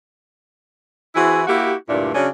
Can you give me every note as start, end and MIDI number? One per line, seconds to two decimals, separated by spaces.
1.15 1.43 52
1.15 1.43 60
1.15 1.43 64
1.15 1.43 66
1.15 1.43 68
1.47 1.74 58
1.47 1.74 64
1.47 1.74 66
1.47 1.74 67
1.89 2.10 38
1.89 2.10 43
1.89 2.10 46
1.89 2.10 62
1.89 2.10 64
2.14 2.28 49
2.14 2.28 54
2.14 2.28 61
2.14 2.28 62
2.14 2.28 68